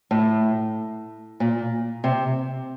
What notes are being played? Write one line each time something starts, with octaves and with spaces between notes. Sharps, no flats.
A2
A#2
C3